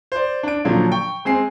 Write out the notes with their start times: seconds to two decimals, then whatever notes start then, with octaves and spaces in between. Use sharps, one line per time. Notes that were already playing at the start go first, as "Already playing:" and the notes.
0.12 C5 D5
0.43 D4 D7
0.65 A#2 D3 F3 F#3
0.91 G5 C#6
1.25 G#3 C4 G#5 C7